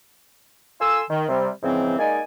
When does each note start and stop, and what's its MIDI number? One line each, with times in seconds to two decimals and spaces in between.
0.80 1.01 65
0.80 1.01 69
0.80 1.01 80
0.80 1.01 84
0.80 1.01 88
1.10 1.26 51
1.29 1.50 48
1.29 1.50 55
1.63 1.97 44
1.63 1.97 49
1.63 1.97 52
1.63 1.97 53
1.63 1.97 60
1.99 2.20 56
1.99 2.20 58
1.99 2.20 63
1.99 2.20 74
1.99 2.20 80